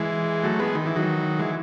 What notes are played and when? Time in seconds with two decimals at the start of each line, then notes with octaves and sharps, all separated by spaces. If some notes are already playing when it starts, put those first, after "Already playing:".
Already playing: E3 G#3
0.43 F#3 A3
0.59 G#3 B3
0.75 D#3
0.86 E3
0.96 D#3 F#3
1.39 E3 G#3